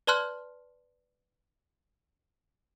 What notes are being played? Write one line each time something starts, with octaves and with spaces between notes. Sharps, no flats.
B4 D5 A5 C6 F6 F#6